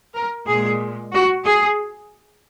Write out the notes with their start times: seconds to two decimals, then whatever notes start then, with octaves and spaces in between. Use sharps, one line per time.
0.14 A#4
0.47 A#2 G#3 G#4
1.13 F#4
1.45 G#4